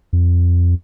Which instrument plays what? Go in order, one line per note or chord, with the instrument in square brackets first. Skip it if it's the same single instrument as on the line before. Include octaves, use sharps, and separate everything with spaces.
[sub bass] F2